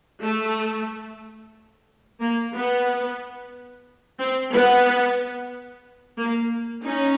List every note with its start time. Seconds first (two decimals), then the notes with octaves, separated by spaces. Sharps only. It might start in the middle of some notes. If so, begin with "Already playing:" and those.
0.22 A3
2.21 A#3
2.54 B3
4.19 C4
4.52 B3
6.18 A#3
6.84 C#4 D#4